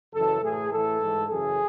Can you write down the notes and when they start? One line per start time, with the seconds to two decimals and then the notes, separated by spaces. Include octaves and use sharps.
0.13 F#2 C#3 E3 A4
0.42 A2 E3 G#4
0.72 A2 E3 A4
1.00 G#2 E3
1.30 F#2 C#3 E3 G#4